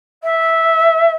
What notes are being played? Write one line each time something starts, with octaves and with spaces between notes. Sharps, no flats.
E5